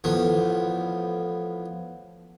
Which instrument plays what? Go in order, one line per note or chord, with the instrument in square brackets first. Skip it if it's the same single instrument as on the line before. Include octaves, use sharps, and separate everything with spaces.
[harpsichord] A1 F3 B3